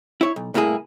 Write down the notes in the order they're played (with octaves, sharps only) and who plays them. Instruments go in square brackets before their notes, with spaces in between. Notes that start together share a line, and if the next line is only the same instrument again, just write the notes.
[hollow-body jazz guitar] E4 C#5
B1
C2 A2 A#3 E4 G#4